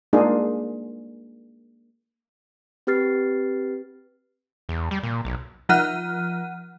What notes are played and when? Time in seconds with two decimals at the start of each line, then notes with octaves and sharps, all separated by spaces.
0.13 G#3 A#3 D4 D#4 F4 G#4
2.87 C4 G4 B4 F6 A6 C7
4.69 E2
4.91 G3
5.03 A#2
5.25 B1
5.69 F3 F4 F#5 F6 F#6 D#7